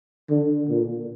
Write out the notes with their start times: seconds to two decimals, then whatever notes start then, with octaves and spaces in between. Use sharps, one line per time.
0.30 D3
0.69 A#2